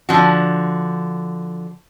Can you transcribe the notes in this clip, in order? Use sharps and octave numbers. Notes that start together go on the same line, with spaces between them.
D3 F3 F#4